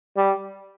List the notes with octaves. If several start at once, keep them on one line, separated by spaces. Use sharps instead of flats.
G3